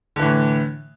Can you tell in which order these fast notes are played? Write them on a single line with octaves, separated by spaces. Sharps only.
D3 E3 A2